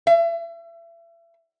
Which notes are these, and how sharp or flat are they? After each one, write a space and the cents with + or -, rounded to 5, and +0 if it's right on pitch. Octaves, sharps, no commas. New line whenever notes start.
E5 +35